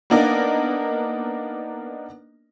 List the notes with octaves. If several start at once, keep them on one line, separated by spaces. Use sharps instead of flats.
A#3 B3 D4 D#4 A#4 D#5